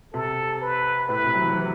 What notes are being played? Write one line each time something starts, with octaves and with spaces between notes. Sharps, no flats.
C3 A4
B4
A2 B4
C3
F#3
E3
F#3
E3